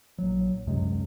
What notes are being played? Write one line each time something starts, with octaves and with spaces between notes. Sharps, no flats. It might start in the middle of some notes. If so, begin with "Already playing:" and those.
A#1 F#3
C#2 F#2 C3 G#3